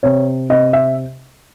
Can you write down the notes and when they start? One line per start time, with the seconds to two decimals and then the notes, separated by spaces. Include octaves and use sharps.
0.03 C3 C#5
0.49 C3 D#5
0.73 E5